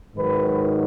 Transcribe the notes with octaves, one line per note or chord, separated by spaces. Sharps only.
G#2 D#3 F#3 B4